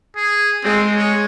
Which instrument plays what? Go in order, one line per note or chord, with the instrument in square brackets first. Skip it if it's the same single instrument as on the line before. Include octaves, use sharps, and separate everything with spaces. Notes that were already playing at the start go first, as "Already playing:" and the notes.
[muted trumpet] G#4
[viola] G#3 [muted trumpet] C4
[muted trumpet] C#5